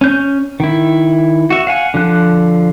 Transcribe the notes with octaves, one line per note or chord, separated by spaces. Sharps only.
C#4 G6
D#3 E4
F#4 E5
F5 F#5 G#5
D3 F3 F#6